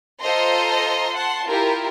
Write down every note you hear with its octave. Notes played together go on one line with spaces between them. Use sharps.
F4 A4 C5 D#5 A#5 C6
F#5 A5 C6
E4 F4 G4 A#4